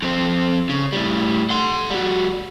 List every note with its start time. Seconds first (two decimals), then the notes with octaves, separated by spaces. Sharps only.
0.02 F2 C4
0.69 C#3
0.92 A2 G3
1.50 F#5 C6
1.90 G3 F#4